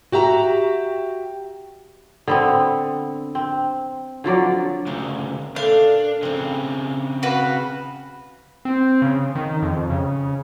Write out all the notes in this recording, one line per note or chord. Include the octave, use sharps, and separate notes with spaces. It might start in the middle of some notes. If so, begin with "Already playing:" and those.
F#4 G4 E5 A#5
D3 B3 C4
C4
D3 F3 F#3 D5
D2 C#3 A#4 C5 E5
A#2 A3 D4 F5
C#3 F3 C4 D4
F#4 B4 F5
C4
C#3
D#3
F2
C#3